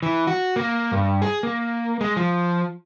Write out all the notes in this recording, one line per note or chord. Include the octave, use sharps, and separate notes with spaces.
E3
F#4
A#3
G2
G#4
A#3
G#3
F3